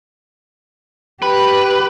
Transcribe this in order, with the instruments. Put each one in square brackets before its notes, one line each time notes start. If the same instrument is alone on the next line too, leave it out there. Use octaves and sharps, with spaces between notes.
[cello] G4 [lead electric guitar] B4